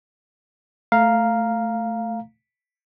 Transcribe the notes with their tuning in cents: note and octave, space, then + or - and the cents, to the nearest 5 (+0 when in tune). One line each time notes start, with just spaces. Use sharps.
A3 +0 F5 +0 A#5 +0